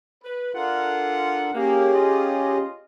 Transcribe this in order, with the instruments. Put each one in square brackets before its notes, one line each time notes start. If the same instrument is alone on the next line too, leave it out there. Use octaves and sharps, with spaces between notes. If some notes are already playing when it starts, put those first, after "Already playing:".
[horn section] B4
[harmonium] D4 A4 A#4 [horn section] F4 F#5
[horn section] A#3 [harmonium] C#4 G4 G#4
[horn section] F4 D#5